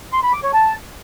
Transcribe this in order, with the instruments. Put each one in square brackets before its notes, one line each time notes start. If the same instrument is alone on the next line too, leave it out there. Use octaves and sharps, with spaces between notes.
[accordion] C6
B5
D6
C#5
A5